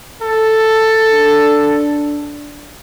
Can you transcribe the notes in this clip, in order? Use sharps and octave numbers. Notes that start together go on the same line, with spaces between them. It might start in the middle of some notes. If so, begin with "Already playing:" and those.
A4
D4